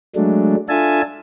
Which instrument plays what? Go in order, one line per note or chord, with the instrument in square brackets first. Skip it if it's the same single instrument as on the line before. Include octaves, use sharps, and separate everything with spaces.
[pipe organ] F#3 G#3 A3 D4
D4 F4 A4 E5 G#5 A5